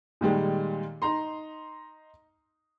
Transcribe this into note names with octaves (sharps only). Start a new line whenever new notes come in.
A#2 D#3 G3 G#3
D#4 A#5 C6